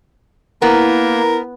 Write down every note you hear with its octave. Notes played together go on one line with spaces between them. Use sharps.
A#3 B3 E4 A#4